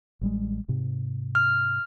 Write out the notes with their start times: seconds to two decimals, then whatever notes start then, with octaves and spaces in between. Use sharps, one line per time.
0.21 A1 G3 G#3
0.68 G#2 C3
1.35 F6